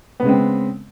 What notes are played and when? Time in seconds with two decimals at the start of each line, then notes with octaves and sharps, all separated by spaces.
0.20 B3
0.23 C#3
0.26 G#3
0.29 C4